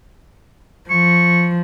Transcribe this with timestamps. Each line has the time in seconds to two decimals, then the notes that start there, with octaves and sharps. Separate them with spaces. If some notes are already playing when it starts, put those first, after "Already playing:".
0.90 F3 C#6